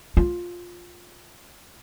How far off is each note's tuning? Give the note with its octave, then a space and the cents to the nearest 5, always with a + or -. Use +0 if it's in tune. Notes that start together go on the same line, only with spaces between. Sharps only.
F4 +10